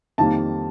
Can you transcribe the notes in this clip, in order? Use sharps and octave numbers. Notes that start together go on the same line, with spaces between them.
F2 D#3 G3 A#3 A5